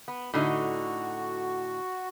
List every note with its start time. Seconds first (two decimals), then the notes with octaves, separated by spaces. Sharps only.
0.08 B3
0.34 A2 D3 D#4 F#4